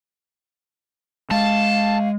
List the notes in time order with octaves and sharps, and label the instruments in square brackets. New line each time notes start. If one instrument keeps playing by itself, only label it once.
[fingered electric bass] G#3 [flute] F5 [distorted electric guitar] A5